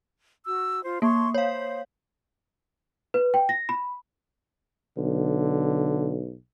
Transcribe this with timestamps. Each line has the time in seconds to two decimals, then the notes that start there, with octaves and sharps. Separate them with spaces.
0.46 F#4 E6
0.84 F4 C5
1.02 A#3 C#5 C6 C#6
1.34 C5 C#5 F5
3.14 B4
3.34 G5
3.49 A#6
3.69 B5
4.98 B1 D3